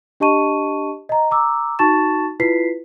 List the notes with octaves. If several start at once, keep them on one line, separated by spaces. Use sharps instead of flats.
D4 G4 D#5 A5 C#6 D#7
D#5 A#5
A#5 D6 E6
D#4 F#4 A5 C#6 A6 E7
E4 F4 B4 B6 C7